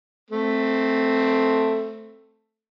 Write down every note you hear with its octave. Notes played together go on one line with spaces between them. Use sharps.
A3 C4